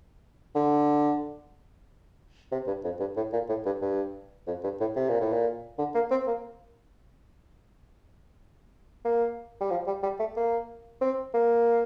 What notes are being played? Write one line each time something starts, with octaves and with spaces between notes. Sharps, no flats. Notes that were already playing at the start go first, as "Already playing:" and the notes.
D3
C3
G2
F2
G2
A2
A#2
A2
G2
G2
F2
G2
A2
C3
A#2
A2
A#2
D3
A#3
C4
A#3
A#3
G3
F3
G3
G3
A3
A#3
C4
A#3